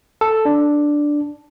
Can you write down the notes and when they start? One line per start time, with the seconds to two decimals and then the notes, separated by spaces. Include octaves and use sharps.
0.21 A4
0.45 D4